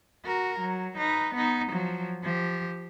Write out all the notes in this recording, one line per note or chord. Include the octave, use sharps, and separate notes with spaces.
F#4 A#4
F#3
D#4 B4
B3 D#4
F3 F#3
F3 G4